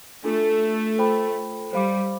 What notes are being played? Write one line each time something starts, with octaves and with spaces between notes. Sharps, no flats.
A3 D4 F4 A4
F4 A4 C5 G5 B5
G3 C5 F5 B5 D6